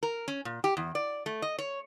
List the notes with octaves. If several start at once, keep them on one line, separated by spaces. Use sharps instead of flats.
A#4
C#4
A#2
G4
E2
D5
A3
D#5
C#5